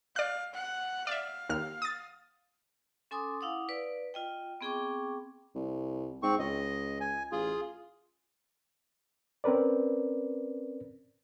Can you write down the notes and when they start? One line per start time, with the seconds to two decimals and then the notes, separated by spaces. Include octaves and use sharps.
0.16 D5 F5 F#6
0.54 F#5
1.07 D5 E5 F5
1.50 D#2 F6
1.82 D#6 A6
3.11 C#4 A4 G#5 C6 D6 D#6
3.41 E4 F5 F#5 D6 D#6
3.69 B4 D5
4.14 F4 D#5 G5
4.61 B3 C4 G#4 G5 C#6 D6
5.55 C2
6.23 G#2 C4 C#6
6.39 C#2 D#5
7.00 G#5
7.32 A1 F4 G#4
9.44 C4 C#4 A#4 B4 D5